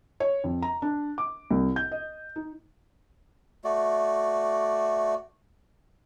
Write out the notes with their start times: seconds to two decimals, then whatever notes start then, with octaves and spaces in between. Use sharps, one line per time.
0.20 C#5
0.44 F2
0.62 A#5
0.82 D4
1.18 D6
1.51 C2
1.76 G6
1.92 D#5
2.36 D#4
3.64 A3 F#4 D5